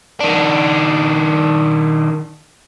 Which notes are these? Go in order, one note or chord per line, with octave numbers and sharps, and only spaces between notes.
D#3 D4